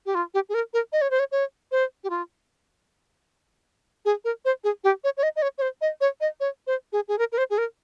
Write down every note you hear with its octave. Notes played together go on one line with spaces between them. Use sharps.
G4
F4
G4
G#4
A#4
A#4
D#5
C#5
C5
C#5
C#5
C5
G4
F4
G#4
A#4
C5
G#4
G4
C#5
C#5
D#5
D#5
C#5
C#5
C5
D#5
C#5
D#5
C#5
C5
G#4
G#4
A#4
A#4
C5
G#4
A#4